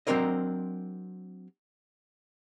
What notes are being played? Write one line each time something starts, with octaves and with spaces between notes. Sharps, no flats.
F#3 C4 D4 A#4 C5 D#5